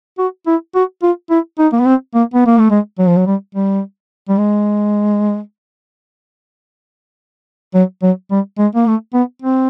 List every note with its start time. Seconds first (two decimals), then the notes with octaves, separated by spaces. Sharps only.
0.18 F#4
0.47 E4
0.75 F#4
1.02 F4
1.30 E4
1.59 D#4
1.72 A#3
1.80 B3
1.86 C4
2.14 A#3
2.34 B3
2.46 A#3
2.58 A3
2.70 G#3
2.99 F#3
3.07 F3
3.16 F#3
3.26 G3
3.55 G3
4.29 G3
4.38 G#3
7.74 F#3
8.02 F#3
8.31 G3
8.58 G#3
8.75 A#3
8.87 A3
9.14 B3
9.42 C4